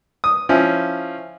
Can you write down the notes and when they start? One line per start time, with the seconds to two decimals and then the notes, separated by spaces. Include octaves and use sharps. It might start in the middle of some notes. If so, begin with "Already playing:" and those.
0.24 D#6
0.49 F3 C#4 E4